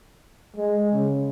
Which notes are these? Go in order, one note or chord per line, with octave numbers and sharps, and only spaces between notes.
G#3
C#3